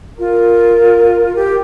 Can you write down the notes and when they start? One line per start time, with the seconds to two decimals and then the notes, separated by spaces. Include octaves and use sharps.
0.19 F4 A#4
1.35 G4